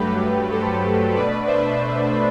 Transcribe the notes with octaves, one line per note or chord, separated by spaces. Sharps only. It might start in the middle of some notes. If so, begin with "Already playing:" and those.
Already playing: G2 F#3 A3 G4 B4
A4 C5
B2 A3 D4 B4 D5
C5 E5